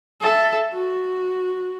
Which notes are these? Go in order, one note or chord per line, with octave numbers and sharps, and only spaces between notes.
A4 E5
F#4